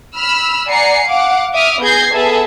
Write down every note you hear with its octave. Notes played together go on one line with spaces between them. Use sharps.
B5 E6 F6
D5 F#5 G#5 A#5 C7 C#7
F5 F#5 D6
E5 D6 D#6 F6
B3 G#4 G6 G#6 A#6 C7
B3 G#4 A4 E5 A5